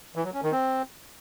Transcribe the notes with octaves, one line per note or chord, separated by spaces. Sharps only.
E3
F#3
C#4
D#3
C4